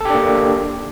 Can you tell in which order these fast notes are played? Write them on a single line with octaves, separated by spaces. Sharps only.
A4 G4 D4 A#3